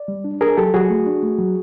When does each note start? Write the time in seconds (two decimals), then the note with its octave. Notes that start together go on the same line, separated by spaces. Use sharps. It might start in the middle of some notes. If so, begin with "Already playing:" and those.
Already playing: D5
0.08 G3
0.24 D4
0.41 D4 G#4 A#4
0.57 F#3 G4 A4
0.74 F#3 F#4 G#4
0.90 A3
1.06 D4
1.23 A3
1.39 F#3